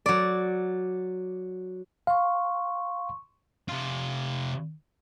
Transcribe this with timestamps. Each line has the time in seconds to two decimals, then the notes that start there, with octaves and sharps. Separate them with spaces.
0.06 F#3 D5
2.07 F5 C6 C#6
3.69 C3 F4